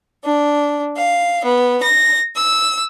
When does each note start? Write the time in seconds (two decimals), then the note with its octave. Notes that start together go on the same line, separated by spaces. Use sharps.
0.24 D4
0.94 F5
1.43 B3
1.82 A#6
2.35 E6